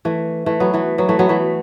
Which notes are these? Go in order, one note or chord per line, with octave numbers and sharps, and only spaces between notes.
E3 A3
E3 A3
F#3 B3
E3 A3
F#3 B3
E3 A3
F#3 B3
E3 A3